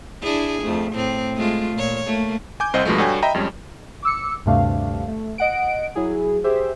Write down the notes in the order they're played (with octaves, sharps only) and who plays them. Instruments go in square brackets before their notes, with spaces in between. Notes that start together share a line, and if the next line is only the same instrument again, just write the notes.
[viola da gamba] D4 E4 G#4
F2 A3
A2 C4
G#3 A3 F4
A#2 C#5
A3 A#3
[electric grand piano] G#5 D6 G6
C2 C4 C5 D#5
G2 B2 F3 G#3 A3
G2 F#4 A4 C#5 G5 G#5
D#5 E5 G5 A#5 B5
F2 G3 G#3 C#4
[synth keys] D6 E6 C#7
D2 G2 C3 A3 D4 F5
A3
D#5 F#5 D7
F#3 E4 G#4
G4 G#4 C5 E5